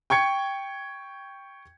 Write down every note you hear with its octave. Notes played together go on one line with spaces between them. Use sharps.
G5 C#6 G#6 C#7